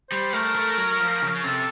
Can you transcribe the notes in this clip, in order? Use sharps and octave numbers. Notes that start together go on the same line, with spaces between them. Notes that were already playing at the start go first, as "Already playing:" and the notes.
G3 C5
A3 A#4
A3
F#3
F3
C#3
C3 A4